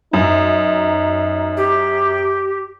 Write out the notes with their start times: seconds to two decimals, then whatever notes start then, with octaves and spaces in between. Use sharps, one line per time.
0.13 F#2 D#4
1.57 G4